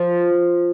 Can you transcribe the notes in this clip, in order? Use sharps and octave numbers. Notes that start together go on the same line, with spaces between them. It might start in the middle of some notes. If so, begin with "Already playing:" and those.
Already playing: F3